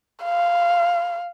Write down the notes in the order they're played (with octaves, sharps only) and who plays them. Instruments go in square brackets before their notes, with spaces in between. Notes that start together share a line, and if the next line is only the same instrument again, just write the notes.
[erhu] F5